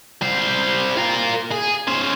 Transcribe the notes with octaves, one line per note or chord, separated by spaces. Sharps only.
G3 C5
F4 A#4
G#4
C#4 C5